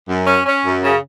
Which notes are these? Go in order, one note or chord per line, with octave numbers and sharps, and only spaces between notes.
F#2
C#4
C#4
F#2
C#3